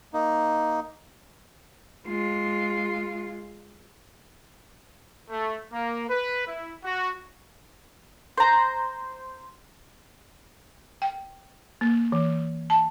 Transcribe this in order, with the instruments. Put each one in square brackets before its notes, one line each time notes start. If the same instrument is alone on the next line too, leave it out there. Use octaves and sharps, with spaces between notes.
[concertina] A#3 D#4
[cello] G#3 F4
[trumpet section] A3
A#3
B4
E4
F#4
[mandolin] C5 A#5
[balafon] G5
A#3
E3
A5